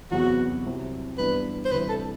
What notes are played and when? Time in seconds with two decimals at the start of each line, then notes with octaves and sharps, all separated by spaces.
0.11 E2 C3 F#3 B3 F#4
0.65 C2 C3 F#3
1.18 G2 E3 B3 D4 B4
1.65 C5
1.71 D2 C3 E3 G3 B4
1.89 A4